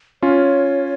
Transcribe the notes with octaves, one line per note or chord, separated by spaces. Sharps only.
C#4 F4 C#5